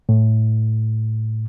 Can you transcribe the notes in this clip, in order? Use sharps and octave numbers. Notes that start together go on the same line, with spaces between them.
A2